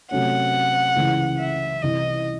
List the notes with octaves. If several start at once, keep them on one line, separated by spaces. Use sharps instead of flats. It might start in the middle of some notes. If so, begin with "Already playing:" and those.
C3 F#3 A3 C#4 F#5
C#2 C#3 E3
E5
C2 C3 E3 D#5